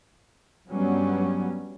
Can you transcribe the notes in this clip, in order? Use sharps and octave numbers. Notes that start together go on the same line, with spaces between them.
G2 F#3 G3 B3 C#4